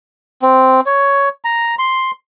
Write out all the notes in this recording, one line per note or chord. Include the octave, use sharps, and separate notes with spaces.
C4
C#5
A#5
C6